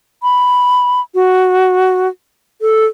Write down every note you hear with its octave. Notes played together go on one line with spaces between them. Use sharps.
B5
F#4
A4